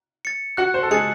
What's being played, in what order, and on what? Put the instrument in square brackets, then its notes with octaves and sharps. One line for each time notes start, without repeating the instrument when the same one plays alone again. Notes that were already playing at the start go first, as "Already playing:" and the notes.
[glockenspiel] A6 C#7
[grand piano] F#4 F#5 [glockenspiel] F#6
[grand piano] C5
A4
[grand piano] G#3 G#4 [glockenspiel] A6 C#7